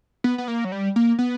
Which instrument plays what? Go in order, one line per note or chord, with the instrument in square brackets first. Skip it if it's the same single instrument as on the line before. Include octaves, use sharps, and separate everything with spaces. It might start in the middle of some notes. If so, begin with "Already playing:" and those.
[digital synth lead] B3
B3
A#3
F#3
G3
A#3
B3